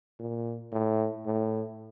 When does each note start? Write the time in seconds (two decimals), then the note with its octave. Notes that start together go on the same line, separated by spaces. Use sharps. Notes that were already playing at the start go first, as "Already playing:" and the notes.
0.19 A#2
0.72 A2
1.26 A2